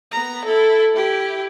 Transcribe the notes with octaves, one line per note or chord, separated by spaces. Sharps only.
B3 A#5
E4 A4
E4 G4